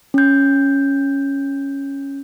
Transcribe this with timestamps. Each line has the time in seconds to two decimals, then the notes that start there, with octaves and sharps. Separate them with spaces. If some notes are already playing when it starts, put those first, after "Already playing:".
0.14 C#4 G6